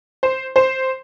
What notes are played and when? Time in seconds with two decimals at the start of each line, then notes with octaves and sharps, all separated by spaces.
0.23 C5
0.56 C5